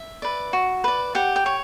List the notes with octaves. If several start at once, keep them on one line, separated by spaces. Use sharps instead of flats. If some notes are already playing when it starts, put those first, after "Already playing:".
Already playing: E5
B4 D5
F#4
B4 D5
G4 F#5
G5
C#5